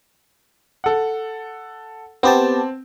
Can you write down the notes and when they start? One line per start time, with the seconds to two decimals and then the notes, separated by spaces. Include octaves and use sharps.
0.84 A4 F#5
2.23 B3 C4 G4 A5